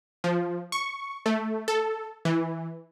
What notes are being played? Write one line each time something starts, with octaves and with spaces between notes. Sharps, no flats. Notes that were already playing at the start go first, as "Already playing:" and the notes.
F3
C#6
A3
A4
E3